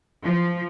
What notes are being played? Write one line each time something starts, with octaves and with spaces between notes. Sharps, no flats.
F3